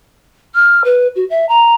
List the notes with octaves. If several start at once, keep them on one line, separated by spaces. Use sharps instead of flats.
F6
B4
F#4
E5
A#5